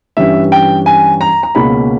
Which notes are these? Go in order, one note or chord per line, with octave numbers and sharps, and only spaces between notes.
G2 E3 G3 C#4 E5
G5
G#5
A#5
A#5
C#2 B2 A#3 C#4 B5